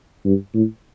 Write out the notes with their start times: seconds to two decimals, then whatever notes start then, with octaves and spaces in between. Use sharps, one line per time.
0.25 G2
0.54 A2